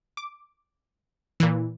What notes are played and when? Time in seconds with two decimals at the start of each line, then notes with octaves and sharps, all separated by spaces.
0.17 D6
1.40 A#2 E3